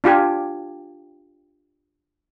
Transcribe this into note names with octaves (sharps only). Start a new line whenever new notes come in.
D4 F4 G4 G#5